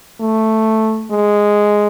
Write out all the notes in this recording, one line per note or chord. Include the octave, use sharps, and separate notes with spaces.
A3
G#3